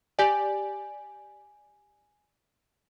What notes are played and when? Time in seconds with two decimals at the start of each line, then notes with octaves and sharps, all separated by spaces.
0.19 G4 D5 G#5